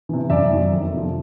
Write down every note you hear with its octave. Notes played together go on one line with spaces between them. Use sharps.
C3 E3
F#2 D5 E5
D#3 F#3
F2
C3 F3